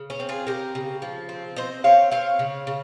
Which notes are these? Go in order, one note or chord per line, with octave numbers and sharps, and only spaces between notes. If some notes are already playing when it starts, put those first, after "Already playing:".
Already playing: C#3
C#4
C4
F4 G#4
C#3 G4 A#4
C#3
F3
C4
C4 C5 D#5
C4 C#5 F5
C4 C#5 F5
C#3
C#3